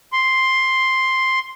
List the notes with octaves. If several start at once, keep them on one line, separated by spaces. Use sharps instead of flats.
C6